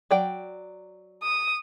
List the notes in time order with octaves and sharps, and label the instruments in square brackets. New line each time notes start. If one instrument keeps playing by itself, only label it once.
[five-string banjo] F#3 D5 G5
[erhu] D#6